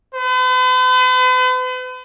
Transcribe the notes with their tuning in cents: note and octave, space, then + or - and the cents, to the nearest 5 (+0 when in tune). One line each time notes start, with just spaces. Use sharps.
B4 +45